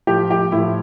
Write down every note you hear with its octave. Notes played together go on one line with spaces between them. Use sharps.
A2 F3 G4
G4
A2 F3 E4